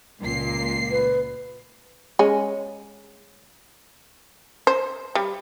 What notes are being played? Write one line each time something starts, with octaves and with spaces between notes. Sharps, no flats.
C#2 A#2 C7
B4
G#3 C#4
C5
G3